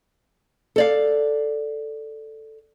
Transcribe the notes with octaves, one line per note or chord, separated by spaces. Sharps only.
A4 D5 F5